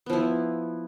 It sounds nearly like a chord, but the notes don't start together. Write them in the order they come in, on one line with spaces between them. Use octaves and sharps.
B3 F3 E4